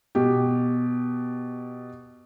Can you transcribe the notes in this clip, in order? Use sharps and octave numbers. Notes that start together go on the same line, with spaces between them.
B2 G4